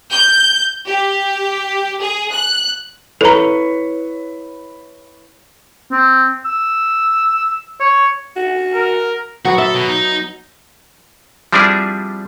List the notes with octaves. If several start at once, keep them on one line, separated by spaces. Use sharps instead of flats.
G6
G4
G#4
F#6
E4 A4 B4 C#5 A#5
C4
E6
C#5
F#4
A#4
F#3 B3 F#4
A4 E5
B2
D#4
F3 G3 C4 D4 E4 G#4